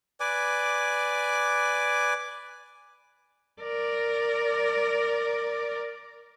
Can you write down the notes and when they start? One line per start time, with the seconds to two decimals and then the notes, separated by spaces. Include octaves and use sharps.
0.20 B4 D5 G#5 D6
3.62 A#4 D5